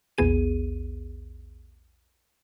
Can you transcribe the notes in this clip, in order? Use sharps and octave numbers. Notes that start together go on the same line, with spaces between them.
A#1 E2 B3 G#4 D#7